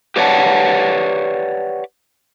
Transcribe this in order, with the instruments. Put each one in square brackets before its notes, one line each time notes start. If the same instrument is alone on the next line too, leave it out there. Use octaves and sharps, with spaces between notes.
[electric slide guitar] G4 B4 C#5 D5 F#5 A5